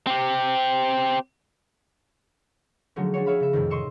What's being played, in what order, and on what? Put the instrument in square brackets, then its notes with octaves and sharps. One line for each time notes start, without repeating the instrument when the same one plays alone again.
[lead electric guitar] C4 G4
[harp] D3 F3 F#3 G#3 A3 C#4
D4 F#4 G#4 C#5
G#4 C#5 E5 F5 B5
C#3 E5
F2 A2 C3 D#3
D#5 C6 C#6 E6